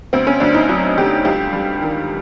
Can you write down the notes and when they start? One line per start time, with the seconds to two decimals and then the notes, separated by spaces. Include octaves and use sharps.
0.13 D2 C4
0.27 C#4
0.40 D2 D4
0.54 D#4
0.69 F#3
0.97 D3 G4
1.25 C#2 G4
1.53 G3
1.82 D#3